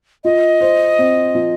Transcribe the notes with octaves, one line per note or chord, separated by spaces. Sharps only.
F4 D#5
C5
C4
F3